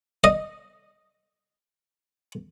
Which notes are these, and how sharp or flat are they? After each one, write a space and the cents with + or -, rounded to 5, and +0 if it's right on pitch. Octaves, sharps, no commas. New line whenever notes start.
D#5 +0